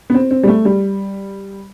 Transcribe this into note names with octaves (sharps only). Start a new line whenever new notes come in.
B3
C4
C4
G3
A3
G3